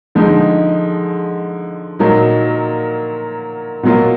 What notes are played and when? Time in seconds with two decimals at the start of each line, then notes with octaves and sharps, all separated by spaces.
0.15 D3 F3 G#3 D#4
1.99 A#2 F#3 A#3 D#4
3.83 B2 F#3 A#3 F4